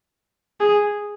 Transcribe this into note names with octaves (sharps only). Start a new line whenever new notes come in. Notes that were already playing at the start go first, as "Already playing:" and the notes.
G#4